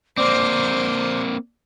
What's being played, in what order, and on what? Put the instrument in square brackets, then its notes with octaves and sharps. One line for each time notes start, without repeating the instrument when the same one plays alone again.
[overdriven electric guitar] A#3 C4 [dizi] C5 [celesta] D5 D6